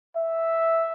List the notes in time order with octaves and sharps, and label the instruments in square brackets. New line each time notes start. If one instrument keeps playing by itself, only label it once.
[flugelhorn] E5